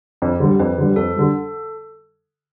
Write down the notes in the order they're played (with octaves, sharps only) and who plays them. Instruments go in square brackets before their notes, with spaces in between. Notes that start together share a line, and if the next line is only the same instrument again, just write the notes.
[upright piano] F2
D3 G3
[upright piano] F2 [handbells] B4
[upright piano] D3 G3
[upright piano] F2 [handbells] A4
[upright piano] D3 G3